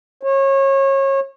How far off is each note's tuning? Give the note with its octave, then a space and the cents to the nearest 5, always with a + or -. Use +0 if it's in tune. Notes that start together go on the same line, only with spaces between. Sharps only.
C#5 -30